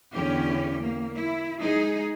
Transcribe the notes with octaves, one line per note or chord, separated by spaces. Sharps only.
E2 D3 C#4 G4
A#3
E4
G#3 D#4 G#4